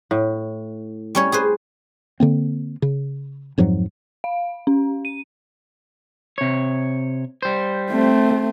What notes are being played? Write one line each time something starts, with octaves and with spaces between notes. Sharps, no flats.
A2
G3 C#4 C#5
G#4 B4 C5
D3 A#3 C4
C#3
F2 G#2 F3 F#3
F5
C#4
D#7
C3 C#5
G3 C5
A3 C4